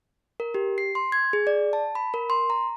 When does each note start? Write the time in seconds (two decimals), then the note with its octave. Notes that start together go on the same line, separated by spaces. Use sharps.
0.40 A#4
0.54 G4
0.78 C7
0.95 C6
1.12 G#6
1.33 G#4
1.47 D5
1.73 A5
1.95 B5
2.14 A#4
2.30 C6
2.50 A#5